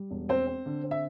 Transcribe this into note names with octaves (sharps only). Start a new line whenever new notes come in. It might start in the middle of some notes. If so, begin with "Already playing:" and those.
Already playing: G3
E1
C4 C5
C4
D3
C4
E5